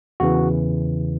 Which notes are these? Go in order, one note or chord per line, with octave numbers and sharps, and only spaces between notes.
E2 C#3 E3 F#4